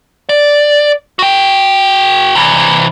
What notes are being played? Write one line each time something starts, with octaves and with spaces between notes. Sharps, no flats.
D5
F#4 G5
C3 E3